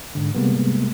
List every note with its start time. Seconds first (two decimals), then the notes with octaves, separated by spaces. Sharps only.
0.15 G#2 D3
0.35 C3 G3 G#3 A#3 B3